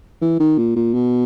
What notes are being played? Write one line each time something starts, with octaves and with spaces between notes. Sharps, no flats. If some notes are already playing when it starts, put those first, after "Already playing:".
E3
D#3
A#2
A#2
B2